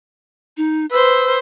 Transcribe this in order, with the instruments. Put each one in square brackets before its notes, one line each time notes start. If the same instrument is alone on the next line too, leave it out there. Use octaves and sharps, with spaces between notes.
[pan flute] D#4
[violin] B4 C5 [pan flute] E6